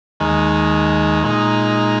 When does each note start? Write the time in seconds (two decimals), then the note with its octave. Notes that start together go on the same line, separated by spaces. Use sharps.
0.20 D#2 D#3 G#3
1.23 A#2 G#3 D#4